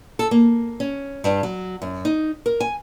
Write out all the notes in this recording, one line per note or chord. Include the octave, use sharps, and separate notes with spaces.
A4
A#3
C#4
G2
F#3
F#2
D#4
A#4
G#5